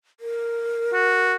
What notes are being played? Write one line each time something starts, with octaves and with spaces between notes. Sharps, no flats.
A#4
F#4